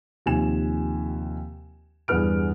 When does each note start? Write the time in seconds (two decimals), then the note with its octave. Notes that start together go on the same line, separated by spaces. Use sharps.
0.26 D#2 C3 F3 G#5 E7
2.08 E2 G2 G#4 B4 F6 D7